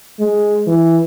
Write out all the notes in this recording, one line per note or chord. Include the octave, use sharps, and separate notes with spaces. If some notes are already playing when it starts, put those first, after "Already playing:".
G#3
E3